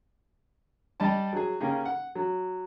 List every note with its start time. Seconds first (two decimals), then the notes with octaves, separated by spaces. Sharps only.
1.00 G3 D5 D#5 A5
1.33 F#3 G#4
1.60 C#3 A#3 C#4 G4 G#4
1.85 F#5
2.15 F#3